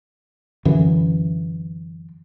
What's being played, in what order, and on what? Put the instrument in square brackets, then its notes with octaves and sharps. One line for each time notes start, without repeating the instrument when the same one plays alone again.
[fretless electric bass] F#2 D3 E3